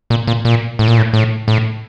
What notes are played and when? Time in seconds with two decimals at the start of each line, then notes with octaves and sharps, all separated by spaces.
0.10 A#2
0.27 A#2
0.45 A#2
0.79 A2
0.88 A#2
0.97 A2
1.13 A2
1.48 A2